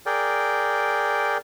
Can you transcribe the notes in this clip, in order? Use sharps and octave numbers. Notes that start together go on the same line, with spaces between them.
G#4 A#4 D5 G5